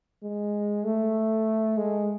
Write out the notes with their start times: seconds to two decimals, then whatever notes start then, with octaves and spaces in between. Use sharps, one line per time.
0.23 G#3
0.84 A3
1.78 G#3